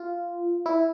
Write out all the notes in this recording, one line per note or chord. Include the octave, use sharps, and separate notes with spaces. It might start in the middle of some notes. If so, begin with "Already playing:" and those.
Already playing: F4
E4